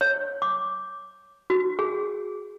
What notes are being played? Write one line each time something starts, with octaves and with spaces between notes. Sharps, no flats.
C#5
D6
F#4
G#4